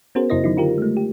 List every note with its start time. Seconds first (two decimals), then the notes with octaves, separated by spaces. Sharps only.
0.15 B3 C#4 F#4 G#4 A#4 C5
0.30 F#2 C#3 E4 C5 D#5 A#6
0.44 D#3 F#3 D#4 E4
0.57 D3 F4 G4 A#4
0.78 G#3 A3
0.97 G4